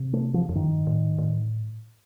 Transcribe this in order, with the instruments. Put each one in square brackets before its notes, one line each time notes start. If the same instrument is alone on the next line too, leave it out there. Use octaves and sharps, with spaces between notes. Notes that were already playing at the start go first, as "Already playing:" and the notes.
Already playing: [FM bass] C3
[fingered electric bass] A3
F3
[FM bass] F2
[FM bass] G2 [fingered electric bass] D#3
[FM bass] A2
A2